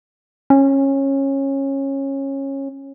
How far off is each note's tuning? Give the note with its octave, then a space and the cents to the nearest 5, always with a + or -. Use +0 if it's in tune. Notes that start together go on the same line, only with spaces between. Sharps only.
C#4 -20